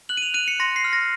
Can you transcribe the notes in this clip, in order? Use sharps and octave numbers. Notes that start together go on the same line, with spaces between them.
F#6 F#7
D#7
F7
F#6 D#7
C#7
C6 A#6
C7
F6
A#6